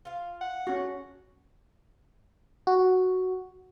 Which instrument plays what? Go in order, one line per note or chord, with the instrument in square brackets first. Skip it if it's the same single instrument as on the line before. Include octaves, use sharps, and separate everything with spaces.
[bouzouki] F4 F5
[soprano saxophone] F#5
[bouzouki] A3 [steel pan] C#4 F#4
[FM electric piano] F#4